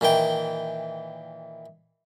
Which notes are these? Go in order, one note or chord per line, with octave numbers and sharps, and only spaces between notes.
A#2 D#3 E3 G5